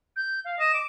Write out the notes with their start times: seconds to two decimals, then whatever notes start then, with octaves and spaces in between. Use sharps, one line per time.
0.16 G6
0.45 F5
0.60 D#5 E7
0.74 D6